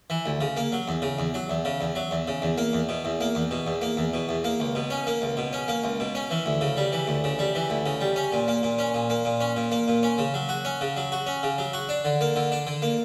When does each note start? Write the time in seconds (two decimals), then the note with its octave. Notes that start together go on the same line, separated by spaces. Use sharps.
0.10 E3
0.26 D2
0.41 C#3
0.57 A#3
0.72 F#3
0.88 E2
1.02 C#3
1.19 E2
1.34 F#3
1.50 E2
1.65 C#3
1.81 E2
1.95 F#3
2.11 E2
2.28 C#3
2.42 E2
2.58 A#3
2.73 E2
2.89 B2
3.05 E2
3.21 A#3
3.35 E2
3.51 B2
3.67 E2
3.82 A#3
3.97 E2
4.14 B2
4.29 E2
4.44 A#3
4.60 C#2
4.75 B2
4.90 C#4
5.07 A#3
5.22 C#2
5.37 B2
5.53 C#4
5.68 A#3
5.84 C#2
6.00 B2
6.15 C#4
6.31 E3
6.46 D2
6.61 C#3
6.77 G3
6.93 E3
7.07 D2
7.24 C#3
7.39 G3
7.55 E3
7.70 D2
7.86 C#3
8.01 G3
8.16 C#4
8.32 A#2
8.48 A#3
8.63 A#2
8.79 C#4
8.94 A#2
9.10 A#3
9.25 A#2
9.40 C#4
9.57 A#2
9.72 A#3
9.88 A#2
10.03 C#4
10.18 C#3
10.34 F#3
10.49 F#4
10.65 C#4
10.81 C#3
10.97 F#3
11.12 F#4
11.27 C#4
11.43 C#3
11.58 F#3
11.73 F#4
11.89 D4
12.05 D3
12.21 A#3
12.36 D3
12.52 D4
12.67 D3
12.82 A#3